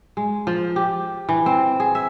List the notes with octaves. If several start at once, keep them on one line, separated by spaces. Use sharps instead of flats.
G#3
F3
G4
E3
C4
G#4
E5